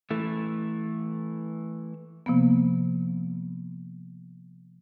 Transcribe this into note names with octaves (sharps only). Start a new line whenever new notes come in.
E3 A3
C3 F3 A#3 B3